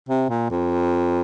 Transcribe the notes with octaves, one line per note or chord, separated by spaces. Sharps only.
C3
A#2
F2